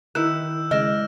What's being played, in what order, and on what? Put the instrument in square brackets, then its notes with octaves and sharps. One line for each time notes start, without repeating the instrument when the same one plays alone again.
[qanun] D#3 E4 [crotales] E6 G6 E7 [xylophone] F#6
[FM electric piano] C#3 G#3 [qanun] D5 [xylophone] D#5 [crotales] F6 A#6 E7